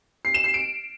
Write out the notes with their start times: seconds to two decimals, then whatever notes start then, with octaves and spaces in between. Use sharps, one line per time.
0.25 C7
0.34 E7
0.44 C7
0.54 D7